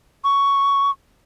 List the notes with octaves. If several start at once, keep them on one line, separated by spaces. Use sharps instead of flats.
C#6